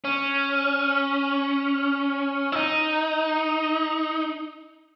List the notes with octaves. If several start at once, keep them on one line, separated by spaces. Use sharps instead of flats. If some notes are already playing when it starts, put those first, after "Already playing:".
C#4
E4
D#4